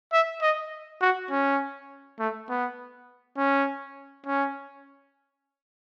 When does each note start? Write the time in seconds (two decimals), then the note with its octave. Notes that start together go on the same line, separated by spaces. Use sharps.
0.13 E5
0.42 D#5
1.01 F#4
1.31 C#4
2.20 A3
2.49 B3
3.38 C#4
4.26 C#4